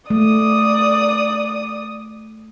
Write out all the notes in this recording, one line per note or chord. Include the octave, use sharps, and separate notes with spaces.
A3 D5 D#6